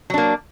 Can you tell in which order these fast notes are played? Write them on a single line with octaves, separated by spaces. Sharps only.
F#3 D4 A#3